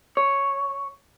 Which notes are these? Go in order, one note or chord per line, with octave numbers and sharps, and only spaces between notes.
C#5